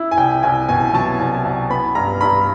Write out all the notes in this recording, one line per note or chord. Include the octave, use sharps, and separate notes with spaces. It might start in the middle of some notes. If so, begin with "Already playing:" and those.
Already playing: E4
G#5
C2 G5
C2 G#5
B2 G#5
F#3 A5
C2
C2
B3 B5
G2 A#5
G2 B5